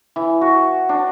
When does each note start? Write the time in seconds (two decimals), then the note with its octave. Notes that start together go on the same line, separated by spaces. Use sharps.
0.16 E3
0.41 F#4
0.89 D4